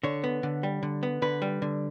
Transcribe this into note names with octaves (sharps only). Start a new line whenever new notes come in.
D3 C#5
B3
D3
G3
D3
B3
D3 B4
G3
D3